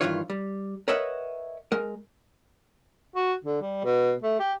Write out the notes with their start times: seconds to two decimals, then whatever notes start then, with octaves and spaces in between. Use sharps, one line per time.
0.01 G2 A#2 D#3 E3 F4 C#5
0.30 G3
0.88 A#4 B4 C#5 D#5 E5 F#5
1.72 G#3 A#4
3.15 F#4
3.44 D3
3.61 G3
3.84 B2
4.22 A3
4.39 G4